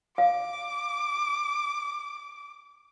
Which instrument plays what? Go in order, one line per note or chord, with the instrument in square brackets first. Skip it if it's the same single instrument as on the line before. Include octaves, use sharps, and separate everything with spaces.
[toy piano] F5 [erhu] D6